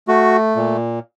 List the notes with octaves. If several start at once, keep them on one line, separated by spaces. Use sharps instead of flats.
A3 F#4
A#2